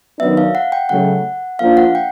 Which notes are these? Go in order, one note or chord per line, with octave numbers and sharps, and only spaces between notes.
D#3 F#3 B3 D4 E5
F5
F#5
G5
C#3 F#3 A3 F#5
F3 A#3 D4 F5
F#5
G5